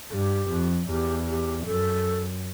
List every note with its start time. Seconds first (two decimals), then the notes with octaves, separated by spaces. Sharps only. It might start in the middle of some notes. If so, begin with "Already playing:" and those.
0.10 G2 A4
0.14 G4
0.49 F2
0.88 E2 G4
1.27 G4
1.66 F#2 A4